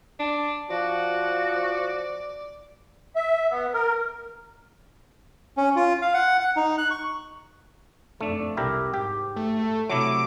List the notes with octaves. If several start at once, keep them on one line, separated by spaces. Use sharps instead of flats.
D4
F3 F#4 D5
E5
B3
A#4
C#4
F4
F5
F#5
F#5
D#4
F#6
C#6
F2 A3 D4
C2 E4 G4 A#4
G#2 G4
A3
C3 F#3 A3 E4 D6